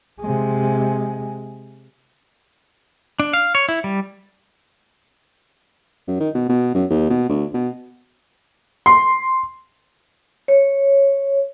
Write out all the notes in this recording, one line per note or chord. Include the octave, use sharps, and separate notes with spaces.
C3 G#3
D4
F5
C#5
E4
G3
F#2
D#3
B2
B2
F#2
D#2
B2
D2
B2
C6
C#5